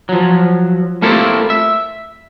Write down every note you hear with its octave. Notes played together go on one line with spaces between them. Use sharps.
F3 F#3
A3 A#3 C4 E4 F4 G4
E5